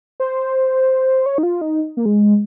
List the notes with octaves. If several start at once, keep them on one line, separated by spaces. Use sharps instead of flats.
C5
C#5
D#4
F4
D#4
A#3
G#3